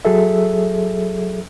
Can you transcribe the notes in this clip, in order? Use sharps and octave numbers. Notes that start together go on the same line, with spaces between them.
F#3 G#4 A4 E5